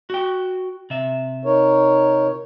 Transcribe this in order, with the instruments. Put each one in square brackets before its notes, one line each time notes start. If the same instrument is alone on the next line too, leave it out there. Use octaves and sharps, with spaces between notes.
[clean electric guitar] F#4 G5
C3 E5
[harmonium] D#4 A#4 C#5